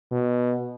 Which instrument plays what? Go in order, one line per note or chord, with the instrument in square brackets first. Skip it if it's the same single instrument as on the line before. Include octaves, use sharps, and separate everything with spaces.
[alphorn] B2